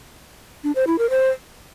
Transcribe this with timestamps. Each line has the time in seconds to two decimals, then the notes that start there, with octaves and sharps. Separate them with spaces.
0.64 D4
0.75 C5
0.87 E4
0.98 A#4
1.10 C5